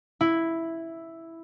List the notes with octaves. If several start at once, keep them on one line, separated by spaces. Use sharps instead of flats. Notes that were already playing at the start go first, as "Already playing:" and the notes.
E4